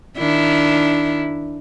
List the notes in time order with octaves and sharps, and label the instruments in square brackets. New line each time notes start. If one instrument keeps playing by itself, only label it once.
[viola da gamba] D#3 D4 E4